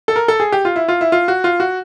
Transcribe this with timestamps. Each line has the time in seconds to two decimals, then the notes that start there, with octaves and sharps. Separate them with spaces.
0.08 A4
0.16 A#4
0.28 A4
0.40 G#4
0.52 G4
0.65 F4
0.76 E4
0.88 F4
1.01 E4
1.12 F4
1.28 F#4
1.44 F4
1.60 F#4